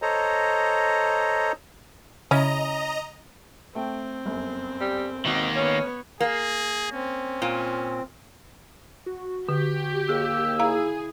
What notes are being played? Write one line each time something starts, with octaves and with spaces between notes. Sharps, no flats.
A4 C5 C#5 D#5 A#5
C#3 C#4 E4 D#5 A#5
A3 C4 G5
G1 F#2
G3
G#1 B2 D#3 A#3 F#4
B3 C#4 C#5
A#3 G#4
C4 C#4
A#2
F#4
D3 G4
D#2 A#3 G#4 E6
E4 G#4 F5 A#5